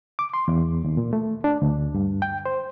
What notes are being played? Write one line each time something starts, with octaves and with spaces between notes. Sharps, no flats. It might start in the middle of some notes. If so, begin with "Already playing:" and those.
D6
C6
E2
D#2
A#2
A3
D4
D2
G2
G5
C5